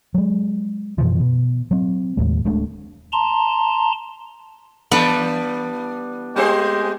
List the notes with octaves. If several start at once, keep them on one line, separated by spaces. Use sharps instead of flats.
F#3 G#3
F#2 B2 E3 F3
B2
F#3 C4
D#2 A2 G#3
D1 G#3 A3 D4
A5 A#5 C6
E3 G3 B3 D4
G#3 A3 C4 G4 C5